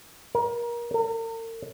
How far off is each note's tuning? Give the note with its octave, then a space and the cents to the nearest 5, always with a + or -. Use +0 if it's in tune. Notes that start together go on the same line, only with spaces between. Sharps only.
A#4 +25
A#4 -45